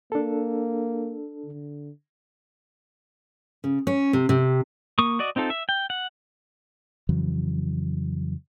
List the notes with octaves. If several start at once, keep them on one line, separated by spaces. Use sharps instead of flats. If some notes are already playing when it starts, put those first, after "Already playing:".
A#3 D4 A4
D3
C#3
C#4
C3
C3
A#3 C#6 D#6
F#4 D5 D#5
C4 D#4 F4 A4
E5
G5
F#5
F2 C#3 E3 F#3